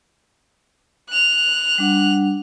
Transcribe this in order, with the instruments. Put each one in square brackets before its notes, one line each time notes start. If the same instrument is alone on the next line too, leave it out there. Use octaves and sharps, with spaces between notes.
[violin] F#6 F7
[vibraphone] G3 D4 F#5